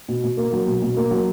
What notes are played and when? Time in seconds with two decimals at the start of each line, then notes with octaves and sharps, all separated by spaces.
0.09 B2
0.23 B2
0.37 A#3
0.53 F#3
0.68 B2
0.82 B2
0.97 A#3
1.11 F#3